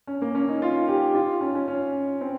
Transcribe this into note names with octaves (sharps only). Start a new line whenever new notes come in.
C#4
A#3
C#4
D#4
F4
G4
F4
C#4
C#4
C#4
C4